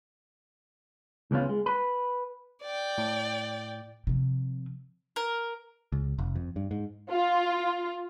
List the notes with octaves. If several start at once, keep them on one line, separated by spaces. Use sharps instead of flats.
C#2 E3 B3 C#4 F4
G#3
B4
D5 G5
A2
C3 F3
A#4
C#2
F1
F2
G2
G#2
F4